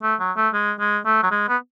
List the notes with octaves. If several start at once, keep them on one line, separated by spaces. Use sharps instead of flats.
A3
F#3
A3
G#3
G#3
A3
F#3
G#3
B3